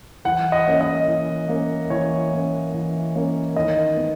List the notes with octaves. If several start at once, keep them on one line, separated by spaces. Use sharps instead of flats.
E3 F#5
D#5
A#3 C#4
D#5
E3
A#3 C#4
E3 C#5
A#3 C#4
E3
A#3 C#4
D#3 D#5
B3